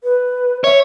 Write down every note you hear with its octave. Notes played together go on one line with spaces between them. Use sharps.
B4
C#5 E5